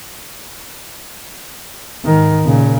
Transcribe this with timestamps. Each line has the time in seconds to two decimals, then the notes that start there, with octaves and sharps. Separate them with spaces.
2.04 G#2 D#3
2.44 A#2 C#3